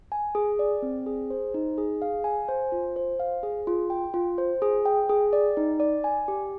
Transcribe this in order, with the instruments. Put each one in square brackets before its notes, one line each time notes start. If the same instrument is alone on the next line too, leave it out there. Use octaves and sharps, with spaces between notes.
[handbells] G#5
G#4
D5
C4
G#4
C5
D#4
G#4
F5
G#5
C5
F4
C5
F5
G#4
F4
G5
F4
C5
G#4
G5
G#4
D5
D#4
D5
G#5
G4